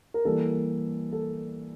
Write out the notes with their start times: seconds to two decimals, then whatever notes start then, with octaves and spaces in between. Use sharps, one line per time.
0.14 A#4
0.25 E3 G3 A#3 A4
1.12 A4